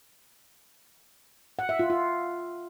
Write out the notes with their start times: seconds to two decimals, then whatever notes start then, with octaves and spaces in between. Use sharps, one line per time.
1.59 F#5
1.69 E5
1.79 F4
1.90 F4